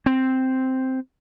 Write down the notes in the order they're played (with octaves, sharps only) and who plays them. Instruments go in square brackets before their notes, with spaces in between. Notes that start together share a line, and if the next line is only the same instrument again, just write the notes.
[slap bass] C4